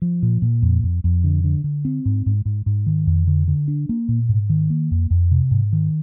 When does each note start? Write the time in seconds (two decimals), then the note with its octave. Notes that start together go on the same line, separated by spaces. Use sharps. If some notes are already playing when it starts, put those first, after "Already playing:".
0.02 F3
0.23 A#2
0.42 A#2
0.62 F2
0.83 F2
1.04 F2
1.24 D3
1.44 D3
1.64 D3
1.85 C4
2.05 G#2
2.26 G#2
2.45 G#2
2.66 G#2
2.86 D#3
3.07 F2
3.27 D3
3.48 D3
3.68 D4
3.89 A#3
4.08 A#2
4.29 G#2
4.50 D#3
4.70 A#3
4.91 F2
5.10 F2
5.31 C3
5.51 G#2
5.73 D#3